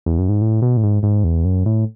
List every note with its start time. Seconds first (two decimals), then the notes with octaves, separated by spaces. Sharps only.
0.06 E2
0.18 F#2
0.29 G#2
0.41 A2
0.62 B2
0.77 A2
0.83 G#2
1.03 G#2
1.24 E2
1.45 F#2
1.66 A2